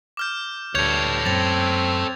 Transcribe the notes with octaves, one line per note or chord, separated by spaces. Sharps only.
D6 F6 G6
D2 G2 A4 C#5 G6 G#6 F7
F#2 F#3 C4 A6 F7